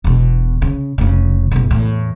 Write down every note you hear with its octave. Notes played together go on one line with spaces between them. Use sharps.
E1 B2
C#3
F1 C#3
F#1 B2
E2 A2